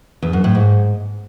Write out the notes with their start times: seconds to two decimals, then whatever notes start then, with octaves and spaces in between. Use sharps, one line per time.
0.22 E2
0.33 F#2
0.44 A2
0.55 G#2